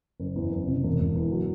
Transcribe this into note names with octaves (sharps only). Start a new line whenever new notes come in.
F#1
E2
F#1
C3
E1
E1
E2
F#3